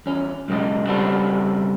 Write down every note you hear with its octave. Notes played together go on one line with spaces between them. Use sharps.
E2 C#4
B1 F#2 C#3 G#3 D#5
C#3 G3 B3 C4 F#4 A4